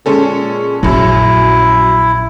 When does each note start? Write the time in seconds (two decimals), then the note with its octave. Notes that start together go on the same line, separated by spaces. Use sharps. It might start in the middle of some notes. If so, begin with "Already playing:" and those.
0.06 A#2 G#3 C#4 A4
0.83 A#1 F#2 F#3 E4